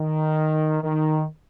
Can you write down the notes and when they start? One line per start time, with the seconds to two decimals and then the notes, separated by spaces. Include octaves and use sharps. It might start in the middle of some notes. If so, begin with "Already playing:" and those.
Already playing: D#3
0.83 D#3